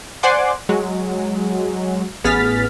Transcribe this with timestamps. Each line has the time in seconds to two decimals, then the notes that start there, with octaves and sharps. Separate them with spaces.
0.23 C5 D5 F#5 G#5 C6 D6
0.69 F#3 G#3
2.24 A1 B3 G#4 F6 A6 B6